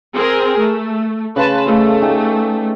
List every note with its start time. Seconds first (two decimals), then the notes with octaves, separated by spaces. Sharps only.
0.14 C4 G#4 A#4
0.59 A3
1.36 C#3 B4 F5 A5 C6
1.66 A3 B4 D#5 F5
2.02 D#4 G4 G#4